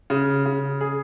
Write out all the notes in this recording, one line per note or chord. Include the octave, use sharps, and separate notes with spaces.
C#3
C#3
G#4